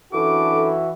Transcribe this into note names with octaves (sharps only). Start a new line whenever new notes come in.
F#2 E3 D4 E4 F#4 A4 D6